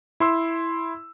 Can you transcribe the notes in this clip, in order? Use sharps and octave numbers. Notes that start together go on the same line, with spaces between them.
E4 C6 E6